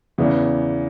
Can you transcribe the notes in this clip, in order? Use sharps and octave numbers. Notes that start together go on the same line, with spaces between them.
E2 C#3 E3 B3